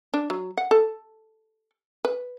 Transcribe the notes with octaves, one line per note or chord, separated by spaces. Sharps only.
D4
F#3
F#5
A4
B4